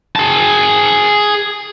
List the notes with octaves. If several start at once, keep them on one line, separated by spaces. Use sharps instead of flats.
G#4 A5